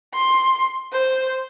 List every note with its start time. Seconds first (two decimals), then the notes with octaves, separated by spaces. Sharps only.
0.14 C6
0.93 C5